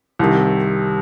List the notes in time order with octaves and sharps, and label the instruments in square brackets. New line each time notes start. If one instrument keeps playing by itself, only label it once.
[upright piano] C2 C3 D#3